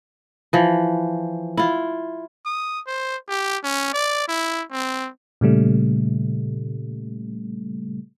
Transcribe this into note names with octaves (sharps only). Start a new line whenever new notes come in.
E3 F3
E4 F4
D#6
C5
G4
C#4
D5
E4
C4
A#2 C#3 G3 A3